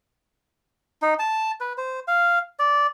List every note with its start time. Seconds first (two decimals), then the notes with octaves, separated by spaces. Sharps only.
1.02 D#4
1.19 A5
1.60 B4
1.78 C5
2.08 F5
2.59 D5